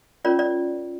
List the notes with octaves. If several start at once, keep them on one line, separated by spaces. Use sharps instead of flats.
C#4 F4 A#4 C#5 D5
D5